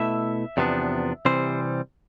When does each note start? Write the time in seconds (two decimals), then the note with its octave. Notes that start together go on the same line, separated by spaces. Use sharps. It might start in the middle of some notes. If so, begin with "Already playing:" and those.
Already playing: B2 A3 E4 E5
0.57 E2 C3 F3 B3 D4
1.25 C3 E3 G3 C4 C5